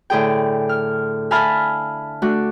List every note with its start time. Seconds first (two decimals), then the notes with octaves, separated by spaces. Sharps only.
0.10 A2 D3 G#4 G5
0.69 F6
1.31 E5 F5 G#5 A5 B5 F6
2.22 A3 D4 F#4